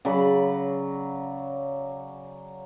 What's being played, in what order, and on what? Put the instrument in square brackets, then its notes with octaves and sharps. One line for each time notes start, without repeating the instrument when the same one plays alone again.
[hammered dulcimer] C#3 F#3 D5 B5